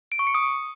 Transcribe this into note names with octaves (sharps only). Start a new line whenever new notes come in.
D7
C#6
C#7
D#6